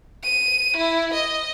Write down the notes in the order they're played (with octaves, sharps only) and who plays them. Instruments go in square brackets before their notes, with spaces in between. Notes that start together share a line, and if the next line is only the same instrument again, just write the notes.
[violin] D#7
E4
D#5